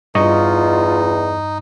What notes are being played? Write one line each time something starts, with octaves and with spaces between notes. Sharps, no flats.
E2 G2 D#4 F4 D#5 C#6